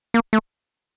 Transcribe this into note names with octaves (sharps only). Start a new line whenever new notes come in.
A#3
A3